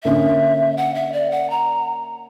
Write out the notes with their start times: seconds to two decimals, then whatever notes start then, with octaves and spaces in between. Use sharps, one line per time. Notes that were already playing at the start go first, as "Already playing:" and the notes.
0.04 D3 A#3 C#4 E5
0.77 F#5
0.95 E5
1.13 D5
1.31 F#5
1.50 A#5